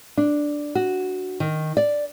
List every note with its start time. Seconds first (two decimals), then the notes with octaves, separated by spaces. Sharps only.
0.17 D4
0.75 F#4
1.40 D#3
1.77 D5